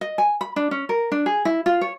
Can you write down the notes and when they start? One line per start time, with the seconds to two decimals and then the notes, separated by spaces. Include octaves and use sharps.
0.01 D#5
0.18 G#5
0.41 B5
0.56 D4
0.71 C#4
0.89 A#4
1.12 D4
1.26 G#4
1.45 E4
1.66 F4
1.81 C#5